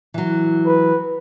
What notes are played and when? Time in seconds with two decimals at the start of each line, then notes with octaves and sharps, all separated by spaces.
0.14 E3 F#3
0.66 B4